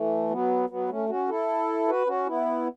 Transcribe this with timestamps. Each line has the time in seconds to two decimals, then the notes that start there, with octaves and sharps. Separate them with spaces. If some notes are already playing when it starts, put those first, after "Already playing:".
Already playing: E3 A3
0.30 F#3 B3
0.70 F#3 B3
0.89 A3 C#4
1.09 C#4 F#4
1.29 E4 A4
1.88 F#4 B4
2.07 C#4 F#4
2.27 B3 E4